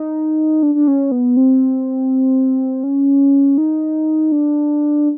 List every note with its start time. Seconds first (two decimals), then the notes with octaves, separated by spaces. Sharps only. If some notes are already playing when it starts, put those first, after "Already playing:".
Already playing: D#4
0.63 D4
0.75 D4
0.88 C#4
1.12 B3
1.37 C4
2.84 C#4
3.58 D#4
4.32 D4